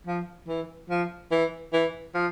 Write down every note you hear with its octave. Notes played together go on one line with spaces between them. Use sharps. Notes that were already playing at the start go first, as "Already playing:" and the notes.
F3
E3
F3
E3
E3
F3